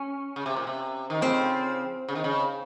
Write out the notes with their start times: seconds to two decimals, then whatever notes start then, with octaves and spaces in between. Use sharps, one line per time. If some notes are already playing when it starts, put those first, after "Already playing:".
Already playing: C#4
0.36 C#3
0.46 C3
0.56 A#2
0.67 C3
1.10 D#3
1.21 C#3 F3 C4
2.09 C#3
2.15 D#3
2.24 C#3